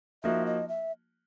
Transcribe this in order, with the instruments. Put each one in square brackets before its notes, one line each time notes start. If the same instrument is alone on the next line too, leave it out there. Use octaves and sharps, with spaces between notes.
[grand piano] F3 A#3 D#4 F#4 [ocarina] E5
[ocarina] D#5
E5